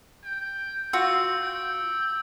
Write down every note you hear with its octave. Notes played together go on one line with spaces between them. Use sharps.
G5
C4 F4 F#4 E6
G5